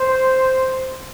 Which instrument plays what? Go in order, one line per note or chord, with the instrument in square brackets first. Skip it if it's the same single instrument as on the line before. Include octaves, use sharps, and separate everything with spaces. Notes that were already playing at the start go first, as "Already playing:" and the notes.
Already playing: [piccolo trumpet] C5